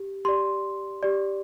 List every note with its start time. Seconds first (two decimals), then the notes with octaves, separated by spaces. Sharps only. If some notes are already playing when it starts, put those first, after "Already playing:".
Already playing: G4
0.25 G4 D5 C6
1.03 G4 D5